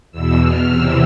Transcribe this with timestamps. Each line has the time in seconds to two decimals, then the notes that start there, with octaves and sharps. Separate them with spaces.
0.12 E2 B2 E6
0.42 F6
0.70 E2 C3 E3 E6